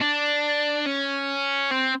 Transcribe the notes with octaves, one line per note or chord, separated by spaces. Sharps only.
D4
C#4
C4